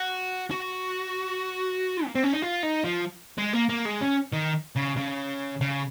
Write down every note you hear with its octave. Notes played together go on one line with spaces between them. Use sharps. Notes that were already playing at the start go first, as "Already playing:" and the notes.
Already playing: F#4
F#4
A#3
C4
C#4
D#4
F4
D#4
F3
G#3
A#3
A#3
G#3
C#4
D#3
C#3
C#3
C#3